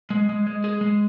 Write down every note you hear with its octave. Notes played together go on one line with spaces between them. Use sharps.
G#3
G#3
G#3
G#4
G#3